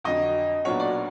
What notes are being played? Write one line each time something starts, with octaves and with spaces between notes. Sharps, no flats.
F2 D3 F#3 D#5
B1 A#2 F#3 B3 D4 C#5
D5